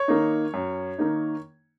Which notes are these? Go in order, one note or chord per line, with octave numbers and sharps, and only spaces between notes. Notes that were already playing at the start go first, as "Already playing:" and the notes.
Already playing: C#5
D#3 A#3 D#4
F#2
D#3 A#3 D#4